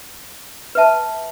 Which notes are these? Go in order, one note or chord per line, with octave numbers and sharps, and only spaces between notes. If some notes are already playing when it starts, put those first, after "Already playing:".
B4 E5 A5